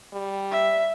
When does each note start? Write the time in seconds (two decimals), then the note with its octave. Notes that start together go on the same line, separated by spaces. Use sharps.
0.13 G3
0.52 E5